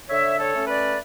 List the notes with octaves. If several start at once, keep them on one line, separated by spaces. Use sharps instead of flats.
D3 C#5 E5
A4 C#5
A3 C#4
B4 D5